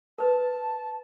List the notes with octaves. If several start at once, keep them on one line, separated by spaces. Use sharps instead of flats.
A#4 B4 A5